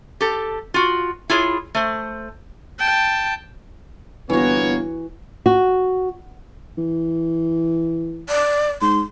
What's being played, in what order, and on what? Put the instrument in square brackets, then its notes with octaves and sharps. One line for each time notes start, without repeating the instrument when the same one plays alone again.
[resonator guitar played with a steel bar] G4 A4
F4 F#4
E4 F4 G#4 C#5
A3 C5
[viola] G5 A5
[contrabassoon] G1 [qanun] E3 F#4 [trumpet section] A#3 C#5 [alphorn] B3
[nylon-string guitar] F#4
[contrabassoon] E3
[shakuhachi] D5
[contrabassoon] G#2 [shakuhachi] C6